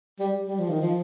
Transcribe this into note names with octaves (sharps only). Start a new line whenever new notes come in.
G3
G3
F3
D#3
F3